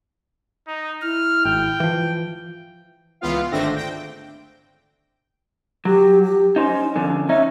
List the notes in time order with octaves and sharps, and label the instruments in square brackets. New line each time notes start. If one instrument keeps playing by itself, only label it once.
[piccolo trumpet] D#4
[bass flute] E4 [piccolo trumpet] F6
[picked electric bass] G#1 [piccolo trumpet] G5
[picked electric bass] E3 F3
[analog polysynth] C#2 E3 B3 F4 F5
G#1 D3 A3 C4 D4 A#6
G5
[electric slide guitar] F#3 [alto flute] G4
[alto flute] G4
[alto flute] C#4 [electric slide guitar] D#4 C5
[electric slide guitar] F2 D3
[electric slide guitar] C#4 D#4 [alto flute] E5